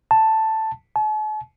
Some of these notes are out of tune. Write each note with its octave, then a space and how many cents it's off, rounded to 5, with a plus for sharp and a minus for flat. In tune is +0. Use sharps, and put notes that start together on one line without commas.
A5 +5
A5 -45